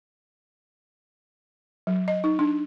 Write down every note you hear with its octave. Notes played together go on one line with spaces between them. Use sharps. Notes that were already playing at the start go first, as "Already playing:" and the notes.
F#3
D#5
D#4
D4